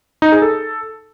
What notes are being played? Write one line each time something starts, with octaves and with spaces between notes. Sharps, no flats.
D#4
G#4
A4